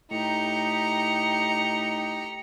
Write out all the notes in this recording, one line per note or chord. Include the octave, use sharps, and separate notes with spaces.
A2 D#4 G4 A#5 C#7